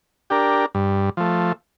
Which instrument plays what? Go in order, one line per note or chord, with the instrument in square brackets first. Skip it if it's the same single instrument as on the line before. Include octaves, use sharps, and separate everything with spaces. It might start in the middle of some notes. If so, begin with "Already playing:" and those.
[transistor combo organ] D4 G4 A#4
G2
F3 A3